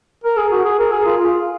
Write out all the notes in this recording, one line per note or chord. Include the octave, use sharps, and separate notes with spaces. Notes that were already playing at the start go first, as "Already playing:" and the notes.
A#4
G#4
F#4
G#4
A#4
G#4
F4